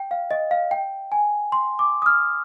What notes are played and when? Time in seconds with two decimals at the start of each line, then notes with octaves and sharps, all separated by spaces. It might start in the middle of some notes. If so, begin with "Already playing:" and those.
Already playing: G5
0.11 F5
0.31 D#5
0.51 F5
0.71 G5
1.12 G#5
1.52 C6
1.79 D6
2.02 D#6
2.06 F6